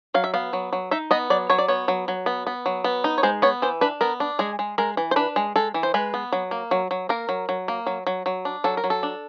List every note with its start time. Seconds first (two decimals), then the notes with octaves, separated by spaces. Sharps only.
0.14 F#3 F5
0.24 E5
0.34 B3 F5
0.53 F#3
0.73 F#3
0.91 D#4 E5
1.11 B3 D#5
1.30 F#3 D5
1.50 F#3 C#5
1.58 D5
1.68 B3 C#5
1.88 F#3
2.08 F#3
2.26 B3
2.47 B3
2.66 F#3
2.84 B3
3.04 D#4
3.18 C#5
3.23 G#3 C5
3.42 B3 C#5
3.62 E3 C5
3.81 D4 B4
4.01 B3 A#4
4.20 D4
4.39 G#3 G#4
4.59 G#3
4.78 G#3 A#4
4.97 E3
5.11 C5
5.16 D4 B4
5.36 G#3
5.56 G#3 A4
5.74 E3
5.83 C5
5.94 G#3 B4
6.14 B3
6.33 F#3
6.51 A#3
6.71 F#3
6.91 F#3
7.09 A#3 A#4
7.29 F#3
7.49 F#3
7.68 A#3
7.87 F#3
8.07 F#3
8.26 F#3
8.45 D4
8.64 F#3 A4
8.77 A#4
8.84 F#3
8.90 A4
9.03 D4